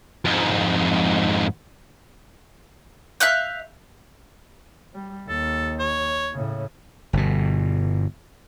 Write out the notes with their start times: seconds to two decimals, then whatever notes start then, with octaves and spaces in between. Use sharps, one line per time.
0.25 F2 G#2
3.20 E5 F5 F#6 G6
4.94 G3
5.29 D#2 A4
5.79 C#5
6.33 A2 C#3
7.13 G1 B2